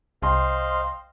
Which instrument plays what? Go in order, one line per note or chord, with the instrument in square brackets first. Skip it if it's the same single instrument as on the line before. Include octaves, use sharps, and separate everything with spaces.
[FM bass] C2 [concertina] C5 D#5 F5 [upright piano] G5 C6